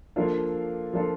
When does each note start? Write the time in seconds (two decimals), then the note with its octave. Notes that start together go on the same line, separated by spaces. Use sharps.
0.16 F3 A#3 D4 F4 A4
0.93 F3 A#3 D4 F4 A4